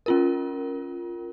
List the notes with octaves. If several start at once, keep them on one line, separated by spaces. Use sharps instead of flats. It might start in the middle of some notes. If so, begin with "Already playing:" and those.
C#4 F4 A#4